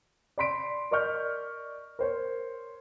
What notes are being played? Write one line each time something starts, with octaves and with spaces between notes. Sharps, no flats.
D5 B5 C6 B6 D7
A#4 D5 D#5 C#6 F6 G6
A#4 C5 C#5